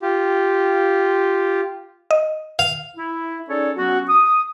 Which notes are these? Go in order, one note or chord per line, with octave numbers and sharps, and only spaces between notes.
F4 G4
D#5
F5
E4
C#4 D#4 G#4 A4 C#5 D5
F#3 B3 C#4 F#4
D#6